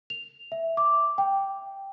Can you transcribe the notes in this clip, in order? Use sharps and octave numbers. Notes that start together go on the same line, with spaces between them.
F7
E5
D6
G5